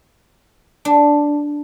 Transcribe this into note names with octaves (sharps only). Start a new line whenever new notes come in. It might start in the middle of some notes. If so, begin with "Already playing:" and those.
D4